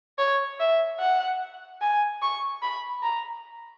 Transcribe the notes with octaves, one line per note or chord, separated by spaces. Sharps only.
C#5
E5
F#5
G#5
C#6
B5
A#5